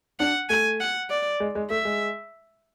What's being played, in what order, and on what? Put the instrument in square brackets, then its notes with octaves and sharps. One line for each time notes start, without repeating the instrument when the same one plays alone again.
[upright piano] D4 [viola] F#5
[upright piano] A3 [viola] G#5
[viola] F#5
D5
[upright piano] G#3
G#3
[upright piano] A3 [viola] E5
[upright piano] G#3